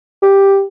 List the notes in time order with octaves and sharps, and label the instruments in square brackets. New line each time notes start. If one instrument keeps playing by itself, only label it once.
[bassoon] G4